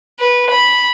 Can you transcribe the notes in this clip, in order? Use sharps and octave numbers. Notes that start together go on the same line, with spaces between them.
B4
B5